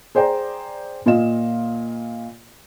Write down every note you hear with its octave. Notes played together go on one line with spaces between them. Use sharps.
G#4 C5 D5 G5 A#5
A#2 F4 D#5 E7